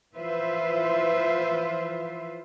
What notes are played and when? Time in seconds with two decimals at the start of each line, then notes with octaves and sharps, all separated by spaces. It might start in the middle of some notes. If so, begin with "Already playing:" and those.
0.15 E3 F3 F4 B4 C5 E5